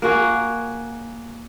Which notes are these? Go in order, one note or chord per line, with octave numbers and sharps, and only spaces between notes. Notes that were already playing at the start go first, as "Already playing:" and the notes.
A#3 F#4 G#4